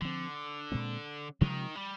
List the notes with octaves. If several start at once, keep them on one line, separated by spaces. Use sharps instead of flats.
D3 F3 C4
A#2 G#3 C4
C3 D#3 F3 G#3
G3